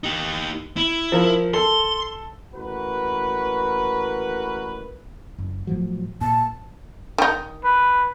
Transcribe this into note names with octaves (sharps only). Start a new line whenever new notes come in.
D#4 G4
E4
F3 A#4
A4 C6
A1 A#3 F#4 A#4 B4
F#1
A2 F3 F#3
A#2 A5
D#3 D#4
B4